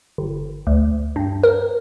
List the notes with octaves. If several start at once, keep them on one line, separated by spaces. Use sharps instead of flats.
G1
D2
G2
A#4